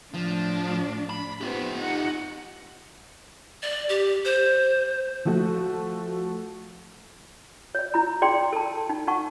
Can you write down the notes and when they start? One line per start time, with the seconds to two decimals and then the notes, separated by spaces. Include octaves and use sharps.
0.14 A2 F3 D4
1.10 B5
1.41 B3 C4 F4 G4
1.77 D#4 F#5
3.63 D5
3.89 G4
4.25 C5
5.25 F3 A3 F#4
7.75 C#5 D5
7.94 E4 A#5
8.22 G#4 D5 G5 C6
8.53 A4 A5
8.90 D#4
9.07 D#4 F#5 A5 C#6